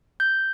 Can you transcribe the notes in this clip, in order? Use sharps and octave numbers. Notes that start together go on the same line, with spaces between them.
G6